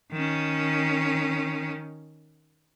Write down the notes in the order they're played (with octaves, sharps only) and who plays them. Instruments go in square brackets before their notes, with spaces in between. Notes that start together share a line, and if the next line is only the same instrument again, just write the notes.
[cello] D#3 C#4